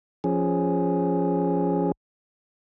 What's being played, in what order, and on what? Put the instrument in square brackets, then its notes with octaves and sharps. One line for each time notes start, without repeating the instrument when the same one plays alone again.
[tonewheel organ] F3 C#4 G#4